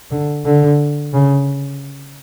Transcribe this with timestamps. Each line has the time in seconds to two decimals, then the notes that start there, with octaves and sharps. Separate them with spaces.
0.11 D3
0.45 D3
1.14 C#3